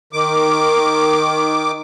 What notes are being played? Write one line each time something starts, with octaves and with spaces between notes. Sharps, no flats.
D#3 D6